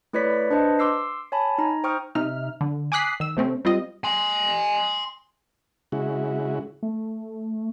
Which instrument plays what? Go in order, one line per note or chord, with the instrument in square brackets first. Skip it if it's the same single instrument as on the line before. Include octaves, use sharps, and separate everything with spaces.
[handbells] A3 E4 B4 C#5 D5 B6
D4 B4 C5 D#5 A5
C6 D6 E6 C7
C#5 G#5 A5 B5
D#4 A#5
C5 G5 C#6 D#6 F6
[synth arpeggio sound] C3 D#4 E5 F6
D3
G#5 D6 D#6 F#6 B6 C7
D#3 E6
C3 A3 C4 C#4
G3 C4 F4 D#5
[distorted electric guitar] G#5 C6
[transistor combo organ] C#3 G#3 E4 F#4
[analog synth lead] A3